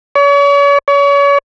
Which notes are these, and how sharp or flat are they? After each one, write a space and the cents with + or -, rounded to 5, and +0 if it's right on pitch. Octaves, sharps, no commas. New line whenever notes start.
C#5 +40
C#5 +35